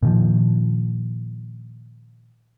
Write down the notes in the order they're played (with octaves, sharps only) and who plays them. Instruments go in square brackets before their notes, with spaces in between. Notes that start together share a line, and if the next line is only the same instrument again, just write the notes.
[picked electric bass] A#2 D#3 F3